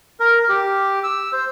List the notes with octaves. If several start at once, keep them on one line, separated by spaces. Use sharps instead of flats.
A#4
G4
E6
C5